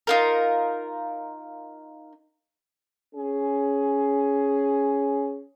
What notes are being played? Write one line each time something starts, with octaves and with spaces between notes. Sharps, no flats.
D#4 F4 A#4
C#4 G#4